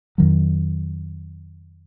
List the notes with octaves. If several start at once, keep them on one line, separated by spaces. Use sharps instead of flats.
F2 D#3 F#3